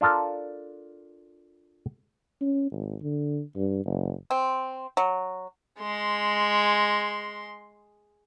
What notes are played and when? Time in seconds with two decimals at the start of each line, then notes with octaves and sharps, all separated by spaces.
0.01 D4 F4 A4 A#4
2.41 C#4
2.71 G#1
3.03 D3
3.56 G2
3.85 F#1
4.31 C4
4.97 F#3
5.80 G#3 C6